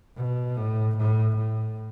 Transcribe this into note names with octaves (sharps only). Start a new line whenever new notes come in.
B2
A2
A2
A2